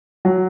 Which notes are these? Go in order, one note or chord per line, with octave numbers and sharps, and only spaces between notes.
F#3